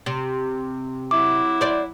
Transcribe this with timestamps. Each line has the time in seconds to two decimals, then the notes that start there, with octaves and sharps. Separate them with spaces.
0.06 C3
1.11 F#3 E4 D6
1.61 C5 D5